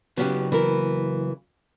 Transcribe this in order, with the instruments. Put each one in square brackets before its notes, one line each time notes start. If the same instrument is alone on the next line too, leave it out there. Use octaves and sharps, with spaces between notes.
[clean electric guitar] C#3 F#3 [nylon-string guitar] B3 C#4 G4
[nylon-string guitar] E3 A#4